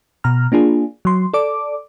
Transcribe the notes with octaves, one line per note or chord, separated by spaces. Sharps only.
B2 A#5 F6
A#3 D4 F4 G#4
F#3 C6
A4 D5 D6